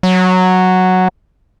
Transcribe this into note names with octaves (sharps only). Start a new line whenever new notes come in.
F#3